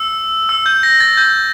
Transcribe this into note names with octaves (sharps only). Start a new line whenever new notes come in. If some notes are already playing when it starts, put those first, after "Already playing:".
Already playing: E6
E6
G6
A#6
A6
G6